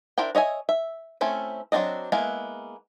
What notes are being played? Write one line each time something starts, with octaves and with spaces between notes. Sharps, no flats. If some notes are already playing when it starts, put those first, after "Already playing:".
D4 E4 A#4 C5 G5
C#5 D#5 E5 G#5
E5
A3 C4 C#4 E4
F#3 A#3 C4 D4 D#5
G#3 A#3 B3 E4